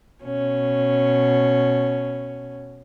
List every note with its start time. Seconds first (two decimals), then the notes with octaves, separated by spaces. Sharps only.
0.22 B2 C#4